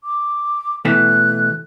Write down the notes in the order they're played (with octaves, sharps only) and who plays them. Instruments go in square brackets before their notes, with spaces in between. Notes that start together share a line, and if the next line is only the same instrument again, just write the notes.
[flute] D6
[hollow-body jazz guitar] B2 E3 A3 [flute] F#6